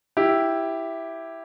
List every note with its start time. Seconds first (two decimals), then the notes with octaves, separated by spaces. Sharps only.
0.17 E4 G4